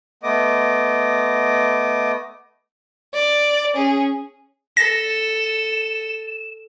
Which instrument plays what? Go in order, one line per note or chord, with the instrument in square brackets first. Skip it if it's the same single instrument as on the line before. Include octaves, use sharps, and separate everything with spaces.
[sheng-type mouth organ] A3 B3 D#5 D6
[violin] D5
C#4 G#4
[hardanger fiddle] A4 [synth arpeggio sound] A#6 [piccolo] E7